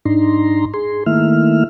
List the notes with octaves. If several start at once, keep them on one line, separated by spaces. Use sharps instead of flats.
G#2 D4 D#4 A#5 C6
G#4 C6
D#3 A3 A#3 E4 E5 F6